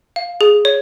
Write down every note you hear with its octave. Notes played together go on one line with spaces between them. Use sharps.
F5
G#4
C#5